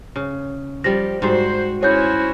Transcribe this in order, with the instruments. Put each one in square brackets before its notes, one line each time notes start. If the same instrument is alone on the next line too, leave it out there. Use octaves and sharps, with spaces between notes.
[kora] C#3
[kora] F3 G3 [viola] G4 [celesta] A#6
[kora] G#2 G3 [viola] F#4 [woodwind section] C5
[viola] C#4 C5 [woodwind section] E4 F#4 [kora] G#4 [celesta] C#5 G6